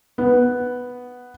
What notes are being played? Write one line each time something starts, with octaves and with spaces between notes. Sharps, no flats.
B3